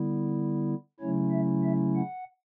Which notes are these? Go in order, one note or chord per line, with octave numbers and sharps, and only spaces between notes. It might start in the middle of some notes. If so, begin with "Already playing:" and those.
Already playing: D3 G3 B3 E4
C#3 F#3 A3 C#4 E4 C#5
E5
E5
F#5